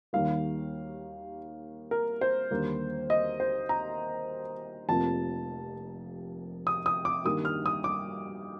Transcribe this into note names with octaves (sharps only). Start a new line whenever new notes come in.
D#2 D#3 G3 A#3 F5
A#4
C5
D#2 D3 G3 A#3
D#5
C5
A#5
F1 F2 C3 F3 A#3 A5
D#6
D#6
D6
G2 D#3 G3 A#3 D#6
F6
D#6
D6